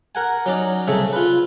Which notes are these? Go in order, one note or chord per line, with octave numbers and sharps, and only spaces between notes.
A#4 F#5 G#5
F#3 C#4 D#4 D5
C2 C#3 A3 G#4 E5 C#6
F4 B4